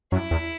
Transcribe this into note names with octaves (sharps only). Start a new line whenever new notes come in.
F#2 E4
E2